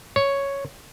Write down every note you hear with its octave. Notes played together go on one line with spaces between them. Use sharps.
C#5